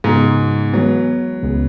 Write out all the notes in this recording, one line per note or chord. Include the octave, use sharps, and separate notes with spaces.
G#2 C#3 G#3 B3 F#4
E3 F#3 G#3 B3
C#2 C#3 G#3 B3